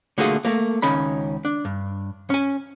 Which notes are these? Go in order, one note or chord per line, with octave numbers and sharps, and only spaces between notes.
D3 A3 A#3 F4 F#4 G#4
A3 A#3
C#2 D#3 C#4 B5
D4
G2
C#4 G#5